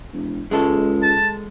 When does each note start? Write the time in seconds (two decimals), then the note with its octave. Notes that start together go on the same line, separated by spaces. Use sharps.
0.13 E1
0.51 C#2 G#3 A4
1.03 A5